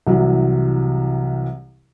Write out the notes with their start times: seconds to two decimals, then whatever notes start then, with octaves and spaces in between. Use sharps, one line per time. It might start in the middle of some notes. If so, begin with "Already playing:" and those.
0.07 C2 C3 E3 F#3